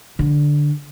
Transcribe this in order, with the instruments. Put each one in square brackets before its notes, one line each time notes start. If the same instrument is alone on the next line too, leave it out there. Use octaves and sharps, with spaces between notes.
[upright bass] D3